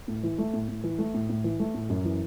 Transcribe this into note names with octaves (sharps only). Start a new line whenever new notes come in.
A2
E3
A3
A2
A2
E3
A3
A2
A2
E3
A3
A2
F#2
E3